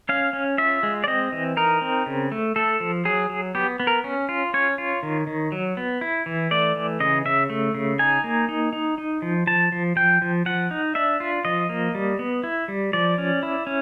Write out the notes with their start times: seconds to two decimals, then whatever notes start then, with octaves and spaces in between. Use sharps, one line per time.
0.09 C#4 F5
0.33 C#4
0.58 F4 E5
0.83 G#3
1.04 D5
1.07 C4 D#5
1.32 E3
1.57 D#4 A#4
1.81 C4
2.06 C#3
2.32 A3
2.56 A3 A4
2.80 F3
3.05 F#3 G#4
3.30 F#3
3.55 B3 G4
3.80 B3
3.87 A#4
4.04 C#4
4.29 F4
4.54 C#4 C#5
4.78 F4
5.03 D#3
5.27 D#3
5.52 F#3
5.77 B3
6.01 E4
6.26 E3
6.51 A3 D5
6.76 E3
7.00 C#3 D#5
7.25 C#3 E5
7.50 A3
7.75 C#3
7.99 D#4 G#5
8.24 A#3
8.49 D#4
8.73 D#4
8.98 D#4
9.22 F3
9.47 F3 A5
9.72 F3
9.96 F3 G5
10.22 F3
10.46 F3 F#5
10.71 D#4
10.95 D4 E5
11.20 F4
11.45 F3 D#5
11.69 A#3
11.95 G3
12.19 B3
12.44 E4
12.68 G3
12.93 F3 D5
13.18 C#4
13.43 E4
13.67 C#4